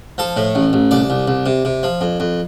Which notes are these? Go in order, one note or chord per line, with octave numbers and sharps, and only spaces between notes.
F3 A4
A2
A1
A1
C2 D5
C2
C2
C3
C3
F3
F2
F2